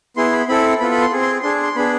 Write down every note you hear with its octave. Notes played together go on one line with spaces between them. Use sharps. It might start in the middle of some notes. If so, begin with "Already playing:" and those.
B3 E4 G#4 C6
B5
C4 E4 A4 B5
B3 F4 A4 B5
B5
C6
C4 G#4
C6
D4 G#4 C6
C6
B3 D4 G#4 B5